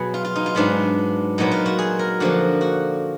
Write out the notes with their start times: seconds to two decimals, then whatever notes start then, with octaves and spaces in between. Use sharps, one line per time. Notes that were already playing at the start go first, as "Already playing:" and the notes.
Already playing: B2 F#3 B3 G#4
0.14 F4
0.25 F4
0.36 D#4
0.46 F4
0.55 G#2 F#3 B3 D4
1.38 A#2 F#3 B3 D#4
1.52 F4
1.66 F#4
1.79 G#4
1.99 A#4
2.20 D3 F3 A#3 F#4
2.61 F#4